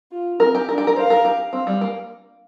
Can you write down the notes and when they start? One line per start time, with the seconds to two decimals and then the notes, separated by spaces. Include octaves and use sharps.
0.12 F4
0.40 C4 A#4
0.55 G4
0.69 D4 A#4
0.78 G4
0.87 A#4
0.96 C5 F5
1.10 A#4
1.25 G4
1.52 C4 F5
1.67 G3
1.81 A#3